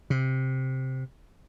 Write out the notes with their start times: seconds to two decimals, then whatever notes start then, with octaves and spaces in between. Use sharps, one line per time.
0.10 C3